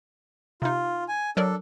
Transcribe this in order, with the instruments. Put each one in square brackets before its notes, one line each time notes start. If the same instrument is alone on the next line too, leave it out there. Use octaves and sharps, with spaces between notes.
[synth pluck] C3 D#4 [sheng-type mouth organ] F4
[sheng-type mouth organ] G#5
[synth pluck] F#3 A#4 D5 [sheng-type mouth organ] D4 A4